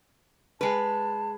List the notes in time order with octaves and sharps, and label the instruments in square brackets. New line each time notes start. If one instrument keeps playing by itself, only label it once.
[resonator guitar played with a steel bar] G#3 B4 [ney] A5